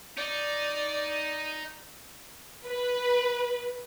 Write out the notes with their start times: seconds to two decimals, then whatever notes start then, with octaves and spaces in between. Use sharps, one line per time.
0.17 D#4 D5
2.66 B4